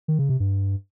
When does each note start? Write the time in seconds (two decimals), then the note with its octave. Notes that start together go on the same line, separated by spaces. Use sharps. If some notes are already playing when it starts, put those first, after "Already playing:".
0.08 D#3
0.19 C#3
0.29 C3
0.40 G2